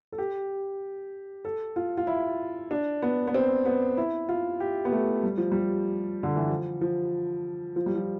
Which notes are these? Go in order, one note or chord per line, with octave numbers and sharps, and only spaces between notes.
A4
G4
A4
F4
F4
E4
D4
B3
B3
C4
B3
E4
F4
G4
B3
A3
G3
F3
G3
D3
E3
F3
F3
F3
G3
F3